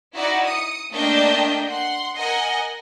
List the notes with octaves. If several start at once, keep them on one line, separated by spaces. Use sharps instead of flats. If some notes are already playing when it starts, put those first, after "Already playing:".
D#4 E4 F#4 D5
D#6 C#7
A3 A#3 D4 D#5 G5 G6
F#5 C6
A#4 D#5 F#5 G#5